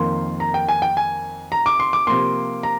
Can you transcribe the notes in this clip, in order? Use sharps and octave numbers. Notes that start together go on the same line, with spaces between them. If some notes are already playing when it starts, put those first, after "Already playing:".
Already playing: F2 D#3 A#3 C6
A#5
G5
G#5
G5
G#5
A#5
D6
C6
D6
C3 F3 A#3 C6
A#5